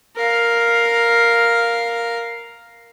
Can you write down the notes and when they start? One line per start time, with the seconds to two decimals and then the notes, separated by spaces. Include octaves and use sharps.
0.16 A#4 F5